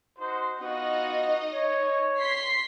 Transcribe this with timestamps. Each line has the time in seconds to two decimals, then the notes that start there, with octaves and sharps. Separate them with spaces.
0.19 D#4 F#4 C5
0.60 B3 D#4 F4 F#4 D#5
1.52 C#5
2.20 C6 B6 C7